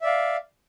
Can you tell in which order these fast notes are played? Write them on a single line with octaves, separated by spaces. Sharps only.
E5 D5 F5